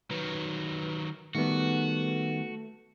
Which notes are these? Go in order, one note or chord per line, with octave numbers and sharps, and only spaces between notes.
D#3 F#3 B4
D#3 G3 A3 B3 F#4